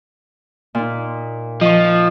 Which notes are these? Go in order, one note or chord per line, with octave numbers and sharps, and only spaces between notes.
A#2 D#4
F3 D#5 C#6